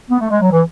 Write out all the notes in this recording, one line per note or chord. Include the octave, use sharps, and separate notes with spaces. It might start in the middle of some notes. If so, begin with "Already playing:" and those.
B3
A3
G#3
F#3
E3